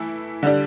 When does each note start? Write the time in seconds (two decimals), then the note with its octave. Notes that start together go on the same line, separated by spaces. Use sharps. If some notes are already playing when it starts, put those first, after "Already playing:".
Already playing: E3 A3 E4
0.43 D3 G3 D4